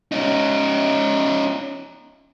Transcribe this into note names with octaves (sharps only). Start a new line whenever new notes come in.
C#4 D#4